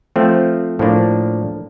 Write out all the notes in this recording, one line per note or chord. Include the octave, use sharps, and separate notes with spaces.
F3 A3 C4
A2 F3 A#3 D4